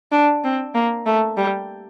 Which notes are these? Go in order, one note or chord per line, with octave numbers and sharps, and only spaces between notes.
D4
C4
A#3
A3
G3